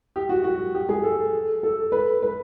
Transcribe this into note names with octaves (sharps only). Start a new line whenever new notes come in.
G4
F#4
F#4
G4
G#4
A4
A4
B4
B4